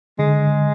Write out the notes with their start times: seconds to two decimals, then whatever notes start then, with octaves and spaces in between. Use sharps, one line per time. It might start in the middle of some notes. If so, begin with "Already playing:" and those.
0.19 D3 G#3